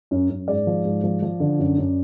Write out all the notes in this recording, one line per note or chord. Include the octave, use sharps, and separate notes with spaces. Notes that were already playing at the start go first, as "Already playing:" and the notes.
F#2
F#2
G#2 D5
F3
G#2
F3
F3
D3
F#2
F#2